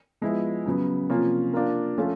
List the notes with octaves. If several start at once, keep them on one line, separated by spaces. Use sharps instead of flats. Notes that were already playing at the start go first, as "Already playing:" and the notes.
F3 G#3 B3 E4
C#3 F#3 B3
C3 F3 A#3 C#4 F4
A#3 D4 F4 A#4
F3 A3 C#4 F4 A4